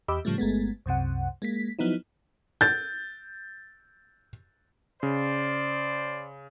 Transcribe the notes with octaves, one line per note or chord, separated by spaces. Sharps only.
E2 G4 D#5 B5 D6 E6
A2 C#3 F3 G3 A3
G1 G#3 A3 B3
C2 F#2 C3 F#5
G#3 A#3 B6
F3 F#3 B3 D#4 E4
G6 A6
C#3 C5 D5